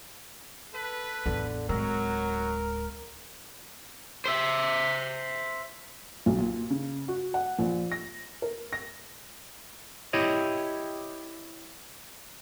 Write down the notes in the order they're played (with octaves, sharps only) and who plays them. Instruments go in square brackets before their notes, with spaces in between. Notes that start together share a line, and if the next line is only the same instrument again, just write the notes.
[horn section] A4 B4
[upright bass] A1 E2 [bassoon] D3
[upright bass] D1 G#3 [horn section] F#3 [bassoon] A#4
[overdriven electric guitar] C5 E5
[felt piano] B1
A#2
C#3
F#4
F#5
A#1
A#6
A#4
A#6
[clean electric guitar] E4 G4 C#5 D#5